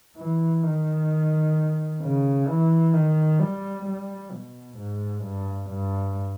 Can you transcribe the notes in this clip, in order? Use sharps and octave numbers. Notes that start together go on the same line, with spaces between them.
E3
D#3
C#3
E3
D#3
G3
G3
B2
G#2
G2
G2